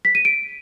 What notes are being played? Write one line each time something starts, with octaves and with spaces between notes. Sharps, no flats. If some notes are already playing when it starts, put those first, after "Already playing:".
B6
D#7
D7